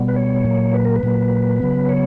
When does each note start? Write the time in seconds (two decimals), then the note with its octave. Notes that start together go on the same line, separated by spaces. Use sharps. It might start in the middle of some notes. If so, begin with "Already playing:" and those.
Already playing: B2 G3 B3
0.08 B4
0.16 C#5
0.44 A#2 F#3 A#3
0.74 B4
0.85 A#4
0.96 B4
1.03 A#2 F#3 A#3
1.60 C#3 F#3 B3
1.89 C#5